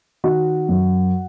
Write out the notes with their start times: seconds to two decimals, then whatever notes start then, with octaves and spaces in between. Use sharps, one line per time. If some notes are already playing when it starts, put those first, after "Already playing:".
0.24 D#3 F#4
0.69 F#2